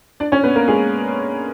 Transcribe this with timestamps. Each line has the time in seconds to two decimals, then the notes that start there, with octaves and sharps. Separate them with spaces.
0.20 D4 D5
0.32 C#4 C#5
0.44 B3 B4
0.55 A#3 A#4
0.68 G#3 G#4